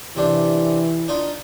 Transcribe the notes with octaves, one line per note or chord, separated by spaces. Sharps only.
C3 E3 D4 C6
D4 D#4 F4